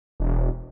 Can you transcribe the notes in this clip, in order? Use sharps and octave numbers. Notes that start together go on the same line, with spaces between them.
E1